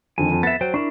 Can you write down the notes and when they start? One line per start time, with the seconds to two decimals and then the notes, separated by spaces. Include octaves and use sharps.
0.18 F2 D3 D#3 G#5
0.32 F2
0.43 B3 E5 A6
0.61 F#3 C5 G5
0.74 D4 E4 A#4 C#6